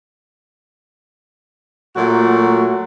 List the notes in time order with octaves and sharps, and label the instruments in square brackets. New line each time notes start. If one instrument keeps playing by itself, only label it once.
[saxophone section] A#2 F#3 A3 F#4